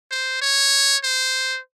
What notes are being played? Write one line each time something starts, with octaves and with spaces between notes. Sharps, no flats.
C5
C#5
C5